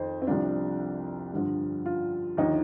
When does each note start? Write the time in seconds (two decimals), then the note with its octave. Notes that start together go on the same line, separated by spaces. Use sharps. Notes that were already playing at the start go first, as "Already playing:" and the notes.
Already playing: F2 D#3 C5
0.22 C4
0.27 C2 C3 F3 D4
1.33 G2 D3 F3
1.86 F4
2.37 D#2 D3 F3 D#4